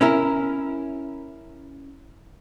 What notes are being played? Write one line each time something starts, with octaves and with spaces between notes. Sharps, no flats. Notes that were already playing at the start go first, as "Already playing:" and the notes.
C#4 E4 A#4